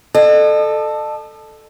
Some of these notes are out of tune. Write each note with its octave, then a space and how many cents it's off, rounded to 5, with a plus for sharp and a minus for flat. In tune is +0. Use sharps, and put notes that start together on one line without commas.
A4 +0 D#5 -45